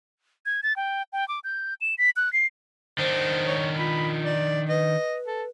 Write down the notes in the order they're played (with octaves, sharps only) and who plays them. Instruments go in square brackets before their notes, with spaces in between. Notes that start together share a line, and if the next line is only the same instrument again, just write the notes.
[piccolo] G#6
A6
G5
G5
D6
G6
E7
B6
F#6
C7
[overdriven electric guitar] D#3 D4 [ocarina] C5
[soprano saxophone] C#5
[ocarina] F4 [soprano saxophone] B5
[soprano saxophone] D5
[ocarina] B4 [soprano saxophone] D#5
[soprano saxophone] A4